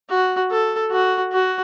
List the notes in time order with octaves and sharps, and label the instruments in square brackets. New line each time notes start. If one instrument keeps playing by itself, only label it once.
[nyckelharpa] F#4
A4
F#4
F#4